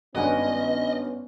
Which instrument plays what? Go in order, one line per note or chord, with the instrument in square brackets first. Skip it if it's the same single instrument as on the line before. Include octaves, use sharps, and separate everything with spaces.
[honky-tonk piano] G#1 G2 [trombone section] B3 C#4 [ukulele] F#4 B4 G#5 [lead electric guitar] D#5